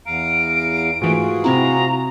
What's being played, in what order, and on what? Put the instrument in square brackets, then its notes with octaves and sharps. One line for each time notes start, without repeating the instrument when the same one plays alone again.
[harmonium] E2 F5 A#5 [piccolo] D7
[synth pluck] G#2 E3 A3 [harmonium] F4 F#4 G#4
[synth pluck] C3 C4 E4 [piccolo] A#5